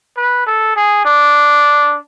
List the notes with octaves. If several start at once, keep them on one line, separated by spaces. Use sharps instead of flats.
B4
A4
G#4
D4